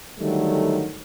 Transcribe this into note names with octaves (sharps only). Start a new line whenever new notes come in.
D3 D#3 F#3 G3 A3